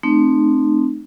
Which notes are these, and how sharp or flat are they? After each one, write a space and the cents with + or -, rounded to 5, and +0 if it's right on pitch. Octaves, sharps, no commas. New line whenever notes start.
A3 -5 C4 +0 D#4 -35